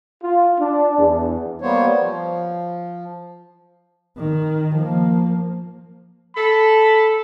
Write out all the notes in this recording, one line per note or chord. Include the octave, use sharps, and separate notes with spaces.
F4
D4
E2
G3 A#3 B3 C5 C#5
F3
D#3
F3 A#3
A4 B5